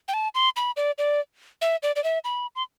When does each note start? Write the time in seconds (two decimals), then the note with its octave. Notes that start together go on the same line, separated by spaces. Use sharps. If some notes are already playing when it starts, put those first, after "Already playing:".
0.08 G5
0.14 A5
0.35 C6
0.56 B5
0.77 D5
0.98 D5
1.62 E5
1.83 D5
1.96 D5
2.04 E5
2.24 B5
2.56 C6